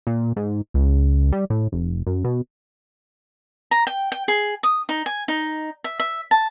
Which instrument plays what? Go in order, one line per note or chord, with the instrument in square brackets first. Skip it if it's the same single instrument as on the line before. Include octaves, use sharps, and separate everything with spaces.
[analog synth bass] A#2
G#2
C#2
G3
A2
F1
F#2
B2
[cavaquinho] A#5
G5
G5
G#4
D#6
D#4
G#5
D#4
E5
E5
A5